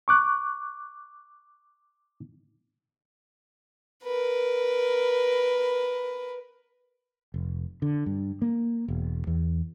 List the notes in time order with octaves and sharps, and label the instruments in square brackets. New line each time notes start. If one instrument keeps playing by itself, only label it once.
[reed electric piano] C#6 D6 F#6
[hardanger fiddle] A#4 B4
[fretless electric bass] F1
D3
G2
A#3
E1
E2